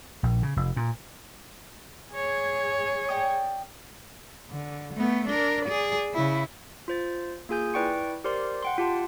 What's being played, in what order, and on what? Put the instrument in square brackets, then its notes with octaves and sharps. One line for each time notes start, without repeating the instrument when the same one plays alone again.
[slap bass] A#1
C#3
F1
A#2
[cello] G#4 C#5
[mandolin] D5 G5 D#6
[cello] D3
A3 B3
D4 A#4
G#4 D5
C#3 E4
[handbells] F4 C5 A6
A#3 F4 G#4 G#5 G6
E4 B4 D5 G5 C#6 C#7
G4 A#4 C5 D5 C6
F#5 G5 C6
F4 G4 A5